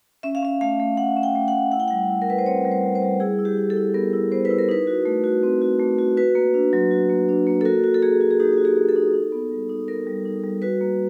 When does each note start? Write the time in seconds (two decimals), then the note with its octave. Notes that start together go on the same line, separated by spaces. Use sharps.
0.23 C#4 E5
0.35 F5
0.43 C#4 E5
0.61 A3 F5
0.80 A3
0.97 A3 F#5
1.17 C#4
1.23 G5
1.35 A3
1.48 F#5
1.53 A3
1.72 E4 F#5
1.80 G5
1.88 G3 F#5
2.10 E4
2.22 A#4
2.27 E4 B4
2.38 C5
2.46 C4 C#5
2.65 G3
2.71 C5
2.84 G3
2.95 C5
3.02 G3
3.20 E4 G#4
3.39 E4
3.45 G4
3.58 E4
3.70 A4
3.76 E4
3.94 B3 A#4
4.13 E4
4.32 B3 C5
4.45 B4
4.50 E4
4.59 A#4
4.69 D#4 B4
4.87 F#4
5.06 A3
5.24 F#4
5.43 C4
5.62 F#4
5.80 A3
5.99 F#4
6.17 F#4 B4
6.35 A#3
6.54 D4
6.73 F#3
6.91 F#4
7.10 A#3
7.29 D4
7.47 A#3
7.61 A4
7.65 F#4 A#4
7.84 F#4
7.94 A4
8.02 A#3 G#4
8.21 F#4
8.31 G#4
8.40 D#4 G4
8.53 F#4 G4
8.65 G#4
8.77 A#3
8.89 A4
8.96 D#4
9.14 D#4
9.32 B3
9.51 G3
9.69 D#4
9.88 B3 A#4
10.07 G3
10.25 D#4
10.44 G3
10.62 F#4 B4
10.81 A#3